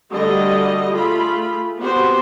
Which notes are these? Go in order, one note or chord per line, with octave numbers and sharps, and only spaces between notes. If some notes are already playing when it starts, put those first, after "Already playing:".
D3 G3 A3 F#4 D#5
A3 F4 G#4 B5
B3 C4 F#4 G4 C5